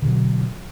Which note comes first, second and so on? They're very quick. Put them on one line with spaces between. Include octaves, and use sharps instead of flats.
D3 B2 F#3